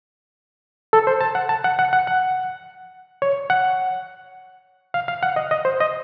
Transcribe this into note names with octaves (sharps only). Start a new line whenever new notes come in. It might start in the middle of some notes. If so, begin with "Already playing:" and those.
A4
C5
A5
F#5
A5
F#5
F#5
F#5
F#5
C#5
F#5
F5
F5
F#5
D#5
D#5
C5
D#5